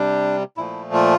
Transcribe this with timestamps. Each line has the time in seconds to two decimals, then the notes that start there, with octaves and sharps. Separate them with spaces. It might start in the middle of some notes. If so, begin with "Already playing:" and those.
Already playing: C3 G3 D4
0.57 A#2 F3 A3 E4
0.93 F4